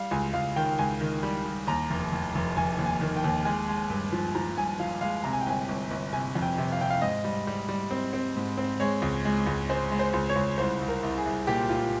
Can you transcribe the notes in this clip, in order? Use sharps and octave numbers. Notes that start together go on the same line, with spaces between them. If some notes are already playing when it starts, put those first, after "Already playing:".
Already playing: G3 F5
C#2 G#5
C#2 F5
D#3 G5
C#2 G#5
D#3
G3
G3
D#2 A#5
F1
F1
F1
F1 G#5
D#2
G#5
D#3
G5
D#2
G#3 G#5
G#3
G2
F3
F3 A#5
G2 G#5
F3 F5
G#3 F5
C3 A#5
G#5
G5
G1 G#5
G1
G1
C3 G#5
F2
G5
C3
F5
C3 G5
F5
G#2 D#5
G3
G3
G3
C4
C4
G#2
C4
G#3 C#5
C#2
G#3
C#2
G#3 C5
G#3
C5
C#2
C#5
C#2
C2 C5
C2
A#4
C2
G#4
C2
A#2 G4
A#2 F4